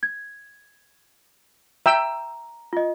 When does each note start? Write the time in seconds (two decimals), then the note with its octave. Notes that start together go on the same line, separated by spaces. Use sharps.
0.03 G#6
1.86 E5 G5 A#5 E6
2.73 F4 D#5